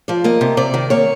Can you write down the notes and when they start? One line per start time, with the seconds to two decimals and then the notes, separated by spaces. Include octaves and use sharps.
0.08 F3 D5
0.24 A#3 D#5
0.41 C3
0.57 C3 D5
0.74 D#3
0.90 A#3 C#5